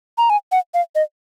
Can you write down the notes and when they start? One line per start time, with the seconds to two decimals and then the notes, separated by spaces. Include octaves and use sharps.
0.18 A#5
0.30 G#5
0.52 F#5
0.74 F5
0.95 D#5